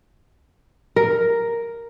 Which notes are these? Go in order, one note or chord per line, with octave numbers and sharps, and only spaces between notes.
A#4